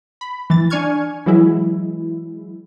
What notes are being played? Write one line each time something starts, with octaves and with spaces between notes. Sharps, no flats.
B5
E3 A6
D4 G#5 C#6 F6 G#6
E3 F#3 G#3 E4